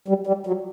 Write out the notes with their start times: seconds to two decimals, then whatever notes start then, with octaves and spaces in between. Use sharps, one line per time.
0.08 G3
0.27 G3
0.47 F#3